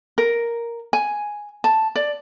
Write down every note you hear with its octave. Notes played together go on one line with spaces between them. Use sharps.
A#4
G#5
A5
D5